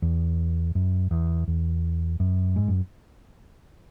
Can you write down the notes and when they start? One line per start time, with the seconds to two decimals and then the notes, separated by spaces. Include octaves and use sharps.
0.02 E2
0.75 F#2
1.11 E2
1.48 E2
2.20 F#2
2.56 G#2
2.68 F#2